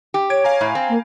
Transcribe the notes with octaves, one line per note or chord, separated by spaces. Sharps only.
G4
C#5 G#6 D7
F5 G#5 A#5
A2
C4
A#3